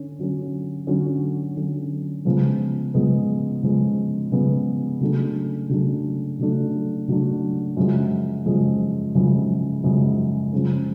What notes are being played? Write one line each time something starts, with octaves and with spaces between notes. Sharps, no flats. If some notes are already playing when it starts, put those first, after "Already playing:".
Already playing: D3 C#4
D3 F#3 C#4
D3 F#3 C#4
D3 F#3 C#4
C#3 F3 G#3 B3
C#3 F3 G#3 B3
C#3 F3 G#3 B3
C#3 F3 G#3 B3
C#3 F#3 A3 D4
C#3 F#3 A3 D4
C#3 F#3 A3 D4
C#3 F#3 A3 D4
F#2 C#3 F3 G#3
F#2 C#3 F3 G#3
F#2 C#3 F3 G#3
F#2 C#3 F3 G#3
C#3 F3 G#3 C#4